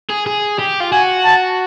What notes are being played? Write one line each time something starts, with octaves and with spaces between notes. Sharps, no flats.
G#4
G#4
G4
F4
F#4 G#5
A5